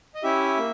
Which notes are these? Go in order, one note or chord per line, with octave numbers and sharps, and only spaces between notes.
D#5
C#4 E4 G4 E5
A#3